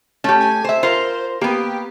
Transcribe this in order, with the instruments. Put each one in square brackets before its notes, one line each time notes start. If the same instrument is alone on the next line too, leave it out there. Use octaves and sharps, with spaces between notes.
[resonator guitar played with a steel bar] A3 G4 [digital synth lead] C#4
[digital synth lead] G#5
[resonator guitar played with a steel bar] C5 E5
[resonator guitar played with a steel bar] F4 A#4 [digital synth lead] C5
[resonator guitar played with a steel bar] A#3 B3 [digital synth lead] G4